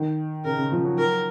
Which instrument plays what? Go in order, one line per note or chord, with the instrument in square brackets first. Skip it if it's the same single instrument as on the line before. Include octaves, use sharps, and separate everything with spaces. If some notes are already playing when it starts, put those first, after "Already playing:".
Already playing: [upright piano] D#3
[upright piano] C#3 [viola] A#4
[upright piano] C#3
F3
F#3
[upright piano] F#3 [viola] A#4